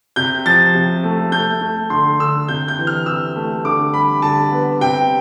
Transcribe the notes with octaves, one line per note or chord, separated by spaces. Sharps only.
C3 G6
F3 A6
C3
A3
A3 G6
A3
D3 C6
D3 E6
C3 G6
G6
E3
F6
C3 E6
A3
D3 D6
G3 B5
D3 A5
B3
C3 G5